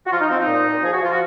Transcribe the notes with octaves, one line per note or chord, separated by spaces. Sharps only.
F#4
F3 F4
D#4
F3 C4
D#4
A#2
A#2
F3 G#4
F#4
F3 F4
F#4